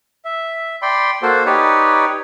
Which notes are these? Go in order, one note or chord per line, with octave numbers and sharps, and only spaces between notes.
E5
D5 G5 B5 C6
A#3 F#4 A4 C5
D#4 G4 B4 C#5 D5